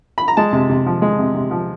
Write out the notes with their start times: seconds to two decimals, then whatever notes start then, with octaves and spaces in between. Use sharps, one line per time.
0.18 B5
0.28 A#5
0.37 G#3 A5
0.53 C3
0.69 C3
0.86 F3
1.02 G#3
1.19 C3
1.34 C3
1.51 F3